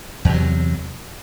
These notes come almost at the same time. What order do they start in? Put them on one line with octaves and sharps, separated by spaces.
E2 C3 F#3